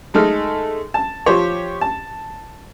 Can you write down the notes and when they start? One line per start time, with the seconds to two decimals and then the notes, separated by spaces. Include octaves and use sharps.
0.14 G#3 A3 D#4 F6
0.94 A5
1.26 F3 G4 C5 C#5
1.81 A5